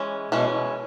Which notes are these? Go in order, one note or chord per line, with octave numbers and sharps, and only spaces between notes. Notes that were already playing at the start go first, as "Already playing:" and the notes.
Already playing: E3 G#3 C#4
B2 E3 G#3 C#4